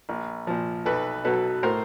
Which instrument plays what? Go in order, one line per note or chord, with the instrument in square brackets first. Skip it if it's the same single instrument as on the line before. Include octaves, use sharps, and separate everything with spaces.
[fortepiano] A#1
A#2 F3
B1 A4 B4
B2 F#3 A4 B4
A2 A#4 C5